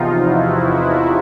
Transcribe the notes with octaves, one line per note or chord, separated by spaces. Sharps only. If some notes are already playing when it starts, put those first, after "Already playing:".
Already playing: E2 C3 F3 D#4 F4
E4 F#4